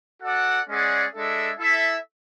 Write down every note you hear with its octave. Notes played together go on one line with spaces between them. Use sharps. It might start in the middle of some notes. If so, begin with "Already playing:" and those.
F#4 A4 D5 F#5
G#3 C#4 G#4 D5 F#5
G#3 D4 A4 E5
E4 A4 E5